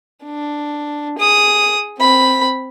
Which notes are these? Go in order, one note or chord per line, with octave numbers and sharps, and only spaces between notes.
D4
G#4 D#6
C4 B5